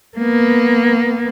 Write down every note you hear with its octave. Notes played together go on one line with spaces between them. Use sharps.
A#3 B3